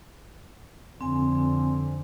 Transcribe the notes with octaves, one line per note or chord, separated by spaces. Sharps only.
F2 D3 C4 G#5